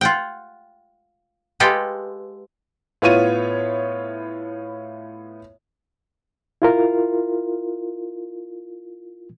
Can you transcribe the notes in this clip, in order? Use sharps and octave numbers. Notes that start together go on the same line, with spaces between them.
F4 F#5 G5
G#3 F4 G4 A4 B4
A2 B3 F4 C#5 D#7
E4 F4 A#4